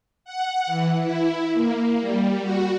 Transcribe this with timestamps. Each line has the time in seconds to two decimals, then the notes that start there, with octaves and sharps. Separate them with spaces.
0.25 F#5
0.66 E3
1.02 E4
1.54 A#3
2.00 G3
2.42 F#4